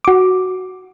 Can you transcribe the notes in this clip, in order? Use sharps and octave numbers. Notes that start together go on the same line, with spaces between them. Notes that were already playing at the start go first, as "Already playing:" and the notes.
F#4 D6